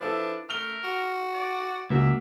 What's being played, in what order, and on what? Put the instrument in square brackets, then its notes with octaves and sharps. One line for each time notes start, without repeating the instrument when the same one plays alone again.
[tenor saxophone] F3 [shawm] D4 [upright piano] E4 A4 B4
[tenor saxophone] A3 [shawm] A#4 [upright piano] F6 F7 G7
[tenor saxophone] F#4
[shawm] D5
[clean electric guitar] C#2 [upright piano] A#3 F#4 [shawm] E5